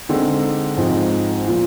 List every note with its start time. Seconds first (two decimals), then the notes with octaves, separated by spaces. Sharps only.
0.09 D3 G#3 C4 D#4
0.77 G#2 F3 C4 D#4 G#4
1.47 A#2 F3